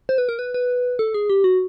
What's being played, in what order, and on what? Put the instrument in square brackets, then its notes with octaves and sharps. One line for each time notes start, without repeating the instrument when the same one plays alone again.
[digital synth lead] C5
B4
A#4
B4
B4
A4
G#4
G4
F#4